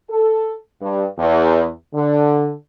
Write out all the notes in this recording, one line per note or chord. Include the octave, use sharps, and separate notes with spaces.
A4
G2
E2
D3